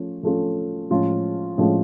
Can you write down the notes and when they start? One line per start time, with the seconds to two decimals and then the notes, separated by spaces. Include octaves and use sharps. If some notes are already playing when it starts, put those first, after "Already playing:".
Already playing: F3 A3 C#4 F4
0.23 F3 A3 C#4 F4 A4
0.90 A2 F3 G#3 C#4 F4
1.58 A2 F3 G#3 C#4 F4